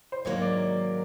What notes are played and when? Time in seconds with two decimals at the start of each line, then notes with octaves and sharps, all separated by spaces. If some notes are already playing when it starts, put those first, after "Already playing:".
0.12 C5
0.25 G#2 D#3 F#3 A#3 C#5
0.41 D5